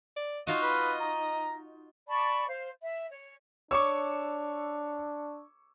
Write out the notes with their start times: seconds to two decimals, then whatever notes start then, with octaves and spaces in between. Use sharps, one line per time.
0.16 D5
0.47 D#4 F4 F#4 D#5
0.62 B4
1.00 A#5
2.08 D5 A5 B5 C#6
2.48 C5 F5
2.80 E5
3.10 C#5
3.71 D4 C#5 C#6 D6 E6